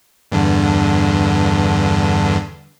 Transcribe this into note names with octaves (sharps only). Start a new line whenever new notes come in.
E2 G2 D3